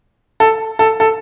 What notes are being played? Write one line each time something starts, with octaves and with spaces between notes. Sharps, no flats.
A4
A4
A4